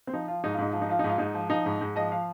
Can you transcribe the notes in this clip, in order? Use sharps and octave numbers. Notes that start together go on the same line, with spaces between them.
C4
F3 D#4
F3 F4
G#2 D#4
F4
G#2 D#4
F3 F4
D#4
F3 F4
D#4
G#2
F4
G#2 D#4
F3
F3 D#4
G#2
G#2
F3 D#5
F3 F5